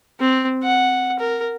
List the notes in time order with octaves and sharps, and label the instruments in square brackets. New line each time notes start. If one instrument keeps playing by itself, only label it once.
[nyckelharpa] C4
F#5
A#4